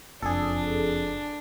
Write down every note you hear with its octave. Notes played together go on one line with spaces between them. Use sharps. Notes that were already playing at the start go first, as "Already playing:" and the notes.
F#1 F2 D4 G#4 A4